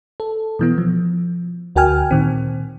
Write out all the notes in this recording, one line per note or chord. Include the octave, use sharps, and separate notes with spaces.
A4
B2 E3 B3
F3
D2 F#4 A#4 G5 G#5 F6
A#2 D#3 C4